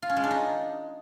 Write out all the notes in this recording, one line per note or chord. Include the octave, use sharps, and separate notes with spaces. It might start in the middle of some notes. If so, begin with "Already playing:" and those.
F4
C#4
G#3
D4
D#4